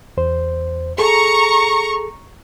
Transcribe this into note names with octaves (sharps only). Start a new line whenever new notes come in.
E2 C5
G#4 A4 A#5 C#6